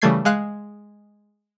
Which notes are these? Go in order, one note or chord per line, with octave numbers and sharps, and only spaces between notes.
C#3 E3 G3 A3 G#6 C7
G#3 F5 F#6